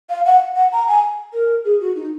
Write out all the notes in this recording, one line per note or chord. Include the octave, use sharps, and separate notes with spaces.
F5
F#5
F#5
A#5
G#5
A#4
G#4
F#4
D#4